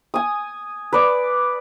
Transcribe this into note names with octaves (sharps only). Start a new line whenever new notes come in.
G#5 D#6
B4 D5